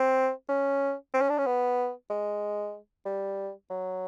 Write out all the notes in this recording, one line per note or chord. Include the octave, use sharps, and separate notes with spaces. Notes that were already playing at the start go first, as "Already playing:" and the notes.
Already playing: C4
C#4
C4
C#4
D4
C#4
B3
G#3
G3
F#3